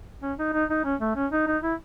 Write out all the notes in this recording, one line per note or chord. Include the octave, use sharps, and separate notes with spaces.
C#4
D#4
D#4
D#4
C#4
A3
C#4
D#4
D#4
E4